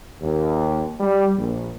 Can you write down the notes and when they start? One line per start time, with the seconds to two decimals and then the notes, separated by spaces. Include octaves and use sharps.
0.21 D#2
1.00 G3
1.37 A#1